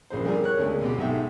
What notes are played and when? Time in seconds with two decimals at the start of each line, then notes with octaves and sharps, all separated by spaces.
0.10 A#1 C#3 C5
0.24 D3 G3 G#4 A#4
0.43 A#4 C#5 F#6
0.58 D2 C#3 G#3 A#3
0.81 B2 C4 G4
0.98 B1 G#2 A4 E5 G5